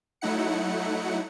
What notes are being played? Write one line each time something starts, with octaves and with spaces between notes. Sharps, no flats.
F#3 A3 D#4 E4 F#5 C#7